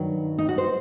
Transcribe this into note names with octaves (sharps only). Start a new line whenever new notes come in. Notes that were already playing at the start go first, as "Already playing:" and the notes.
Already playing: G2 D#3 F#3
D#4
F#4
C5